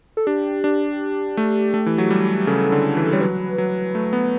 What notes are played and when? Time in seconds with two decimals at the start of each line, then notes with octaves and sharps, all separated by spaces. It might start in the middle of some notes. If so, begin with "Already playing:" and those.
0.17 A4
0.27 D4 G4
0.64 D4
1.37 A3
1.74 A3
1.86 E3
1.98 F#3
2.10 G3
2.47 C#3 A4
2.72 D3
2.97 E3
3.13 G3 C#5
3.21 F#3 B4
3.58 F#3
3.95 A3
4.13 B3